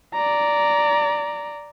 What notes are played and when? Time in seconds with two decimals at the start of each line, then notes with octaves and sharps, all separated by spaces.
0.14 D5 A#5